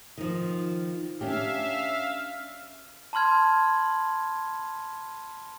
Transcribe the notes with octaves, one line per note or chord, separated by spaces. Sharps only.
D#3 F3
C#4 D4 G4 E5 F5
A5 B5 C6 F6 G#6